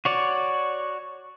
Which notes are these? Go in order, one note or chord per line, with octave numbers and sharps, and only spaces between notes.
F#4 C#5 D5